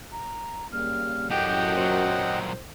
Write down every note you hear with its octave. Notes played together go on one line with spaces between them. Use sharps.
A#5
C#3 G3 A#3 F6
F#2 A2 G4 D#5 F#5 G5 G6
A#2 F#3 C5